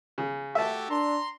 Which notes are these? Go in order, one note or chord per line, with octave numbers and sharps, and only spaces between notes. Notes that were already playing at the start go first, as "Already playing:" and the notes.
C#3
A3 F#4 G4 E5 A5
D4 A#5 C6